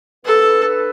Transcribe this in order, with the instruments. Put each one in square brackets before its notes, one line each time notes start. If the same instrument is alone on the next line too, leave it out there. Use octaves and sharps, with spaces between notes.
[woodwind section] D3 B3 D4 B4 [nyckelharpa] A4